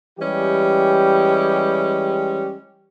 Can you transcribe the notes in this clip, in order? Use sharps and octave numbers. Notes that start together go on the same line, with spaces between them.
E3 G3 G#3 C#4 G4